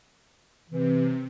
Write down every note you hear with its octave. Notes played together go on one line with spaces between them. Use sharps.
C3 E3